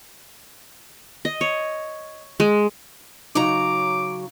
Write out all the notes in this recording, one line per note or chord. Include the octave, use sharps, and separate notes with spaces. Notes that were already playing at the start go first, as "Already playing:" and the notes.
D#5
C#5
G#3
C#3 F#3 D#4 A#5 D6